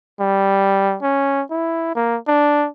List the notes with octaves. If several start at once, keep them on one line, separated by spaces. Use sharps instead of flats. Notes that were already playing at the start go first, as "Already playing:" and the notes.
G3
C#4
E4
A#3
D4